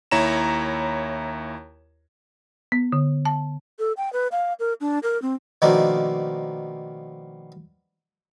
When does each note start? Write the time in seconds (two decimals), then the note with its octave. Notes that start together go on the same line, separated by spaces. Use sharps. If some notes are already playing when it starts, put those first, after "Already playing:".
0.11 D#2 E4 C#5 A#5 E7
2.72 B3
2.92 D3
3.25 A5
3.79 A4
3.97 G5
4.13 B4
4.32 F5
4.60 A#4
4.81 D4
5.03 A#4
5.22 C4
5.62 B2 D#3 F3 A3 A#3 D4